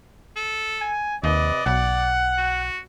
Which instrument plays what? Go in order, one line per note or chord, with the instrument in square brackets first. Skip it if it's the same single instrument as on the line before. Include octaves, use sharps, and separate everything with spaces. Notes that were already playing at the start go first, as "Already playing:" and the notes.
[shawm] A4
[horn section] G#5
[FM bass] D#2 [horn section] C3 B4 D#5 [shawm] D5
[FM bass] B1 [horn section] F#5
[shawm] F#4